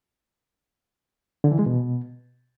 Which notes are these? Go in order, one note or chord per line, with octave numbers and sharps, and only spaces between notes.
D3
E3
G#3
B2